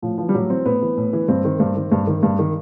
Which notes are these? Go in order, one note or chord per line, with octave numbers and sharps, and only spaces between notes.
A2 F3
E3 F3
G3
A2 F#3
E3 C4
A2 B3
E3
A2
E3
G2 C4
D#3
G2
D#3
G2
D#3
G2
D#3